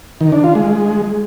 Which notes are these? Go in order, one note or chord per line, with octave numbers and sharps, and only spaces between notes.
D#3
D4
F4
G#3